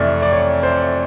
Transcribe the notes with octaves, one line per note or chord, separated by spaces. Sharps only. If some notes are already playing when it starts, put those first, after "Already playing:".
Already playing: F2 C3 E3 A3 D5
D5
C#5
C5